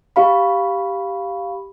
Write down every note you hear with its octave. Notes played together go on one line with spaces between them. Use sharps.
G4 F5 B5